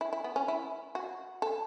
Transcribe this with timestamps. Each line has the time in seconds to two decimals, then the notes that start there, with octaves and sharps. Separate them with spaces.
0.01 E4
0.13 E4
0.24 B3
0.36 C#4
0.48 E4
0.95 F#4
1.42 A4